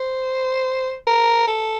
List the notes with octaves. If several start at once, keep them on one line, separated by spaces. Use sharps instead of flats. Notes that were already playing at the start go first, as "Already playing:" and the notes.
Already playing: C5
A#4
A4